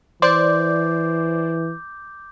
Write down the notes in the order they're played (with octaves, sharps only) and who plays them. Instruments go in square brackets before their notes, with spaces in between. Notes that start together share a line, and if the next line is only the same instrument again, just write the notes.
[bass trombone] E3 [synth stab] C5 D5 [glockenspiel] D6 G6